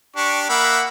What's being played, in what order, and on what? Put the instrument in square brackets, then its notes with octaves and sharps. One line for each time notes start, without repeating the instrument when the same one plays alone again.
[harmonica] D4 G4 [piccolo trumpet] C#6
[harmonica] A#3 E5 B5 [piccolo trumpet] F#5